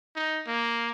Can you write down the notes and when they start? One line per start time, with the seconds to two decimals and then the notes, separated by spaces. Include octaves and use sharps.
0.16 D#4
0.47 A#3